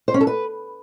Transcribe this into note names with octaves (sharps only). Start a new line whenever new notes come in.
C5
C#4
A4
B4